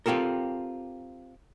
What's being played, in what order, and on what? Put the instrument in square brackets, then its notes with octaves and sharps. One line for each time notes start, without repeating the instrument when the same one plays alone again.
[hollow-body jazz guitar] C4 F4 G4 A4 A#4